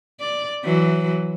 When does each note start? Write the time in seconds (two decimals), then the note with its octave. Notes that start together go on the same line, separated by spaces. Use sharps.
0.20 D5
0.65 E3 F#3